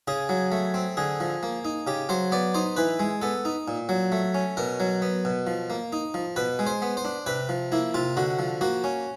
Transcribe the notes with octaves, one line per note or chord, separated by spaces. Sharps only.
C#3 G#4
F#3
A3
C4
D3 G#4
F3
A#3
D#4
C#3 G4
F#3 C5
B3 D5
D#4 C5
E3 B4
G#3
B3 A4
D#4
A#2
F#3
A3
C#4
B2 A#4
F#3
B3
B2
F3
A#3
D#4
F3
B2 B4
G#3
C5
B3
C5
D4
C3 B4
F3
A#3 E4
C3 F4
D3 F#4
F3
A#3 F#4
C#4